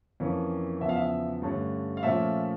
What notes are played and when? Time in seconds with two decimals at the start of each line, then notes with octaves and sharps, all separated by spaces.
0.20 F2 E3 A#3 C#4
0.81 E2 C#3 F3 E5
0.89 F5
0.96 E5
1.42 G2 D3 A3 C#4
1.97 F5
2.03 A#2 F3 A3 C#4 E5